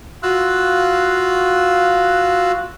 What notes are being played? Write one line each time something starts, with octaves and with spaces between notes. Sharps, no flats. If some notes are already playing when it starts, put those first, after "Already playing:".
F4 F#4 F5 E6 F#6